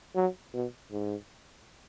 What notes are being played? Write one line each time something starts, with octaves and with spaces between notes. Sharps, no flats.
F#3
B2
G#2